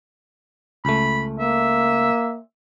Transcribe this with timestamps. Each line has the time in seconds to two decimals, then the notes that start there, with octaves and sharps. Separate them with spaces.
0.85 C#2 A3 B5
1.39 A#3 E5